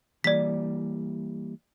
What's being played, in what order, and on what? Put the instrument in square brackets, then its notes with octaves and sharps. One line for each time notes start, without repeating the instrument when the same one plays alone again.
[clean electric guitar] E3 G3 A#3 [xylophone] D5 B6